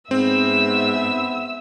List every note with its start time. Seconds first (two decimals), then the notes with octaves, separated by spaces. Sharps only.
0.11 G#2 B3 C4 E5 E6